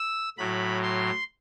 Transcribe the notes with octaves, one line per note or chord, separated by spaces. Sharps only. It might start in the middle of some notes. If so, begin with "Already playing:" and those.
Already playing: E6
A2 F#3 B5
C6